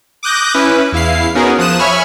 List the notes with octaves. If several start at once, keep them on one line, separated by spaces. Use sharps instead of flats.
D6 D#6 F#6 G6 A#6
C#4 E4 B4
E2 E4 F5 C7
B3 C#4 D#4 F#4 G#4 A#4
F3 D#6 F#6 E7
C#5 E5 G#5 B5 C#6 F6